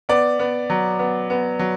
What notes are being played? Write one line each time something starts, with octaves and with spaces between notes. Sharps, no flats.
B3 D5
B3
F#3
B3
B3
F#3